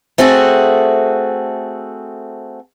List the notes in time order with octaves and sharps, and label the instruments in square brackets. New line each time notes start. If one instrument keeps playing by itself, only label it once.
[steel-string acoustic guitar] A3 C4 F#4 G#4 A4